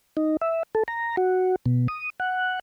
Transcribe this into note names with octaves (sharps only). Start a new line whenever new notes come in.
D#4
E5
A4
A#5
F#4
B2
D#6
F#5